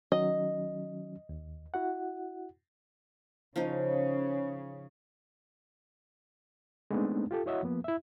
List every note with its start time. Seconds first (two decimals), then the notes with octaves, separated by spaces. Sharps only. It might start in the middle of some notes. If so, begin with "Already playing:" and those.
0.12 D#3 F#3 C#4 D#5
1.29 D#2
1.74 E4 F#4 F#5
3.56 C#3 F3 C#4 D#4
6.91 G#3 A3 B3 C4 D4 D#4
7.31 F4 G4 A4
7.46 E4 F#4 C#5 D#5 E5 F#5
7.63 F3 A#3 B3
7.84 E4 E5